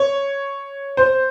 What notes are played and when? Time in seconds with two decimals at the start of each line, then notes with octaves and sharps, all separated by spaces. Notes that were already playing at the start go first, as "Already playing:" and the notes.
Already playing: C#5
0.97 C5